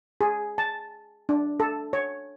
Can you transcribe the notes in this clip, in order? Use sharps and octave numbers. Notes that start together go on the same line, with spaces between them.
G#4
A5
D4
A4
C#5